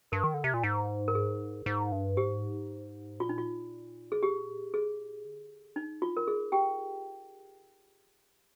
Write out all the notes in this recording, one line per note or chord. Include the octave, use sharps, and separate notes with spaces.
G2 A#4
D#3
D3
C3
A#2
G#2
A#4
G#4
G#2
G2
G#2 G4
A#2 F4
D#4
F4
G#4
G4
G#4
D3
F3 D#4
F4
A#4
G#4
G4 G5